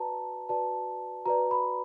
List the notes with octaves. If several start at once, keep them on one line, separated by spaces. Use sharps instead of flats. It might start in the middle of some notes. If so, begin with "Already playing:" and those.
Already playing: F#4 B4 D5 A5 A#5
F#4 B4 D5 A5
F#4 B4 D5 A#5
B5